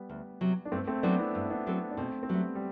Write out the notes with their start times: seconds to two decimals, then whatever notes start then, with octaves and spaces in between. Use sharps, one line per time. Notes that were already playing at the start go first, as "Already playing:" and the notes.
Already playing: G3 B3
0.09 D2
0.41 C3 F#3
0.65 D4
0.72 G2 A3 C4
0.88 A3 C4
1.03 F#3 B3 C4 D4 F#4 A4
1.18 C4 E4
1.35 G2
1.50 B3 D4
1.67 F#3 C4 F#4 A4
1.91 D4
1.97 B2 A3 C4
2.23 C4
2.29 F#3 G3 A3 B3
2.55 G3